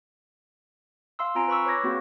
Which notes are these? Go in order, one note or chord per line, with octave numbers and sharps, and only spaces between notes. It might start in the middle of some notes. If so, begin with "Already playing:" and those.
F5 C6 E6
C4 F4 G#5 A#5 D7
B4 B5 C#6 E6
B4 C#5 C#6 D6 G#6 A#6
A#3 C4 F#4 G#4